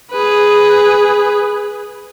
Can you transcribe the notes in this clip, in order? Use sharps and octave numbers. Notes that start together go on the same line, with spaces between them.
G#4 B4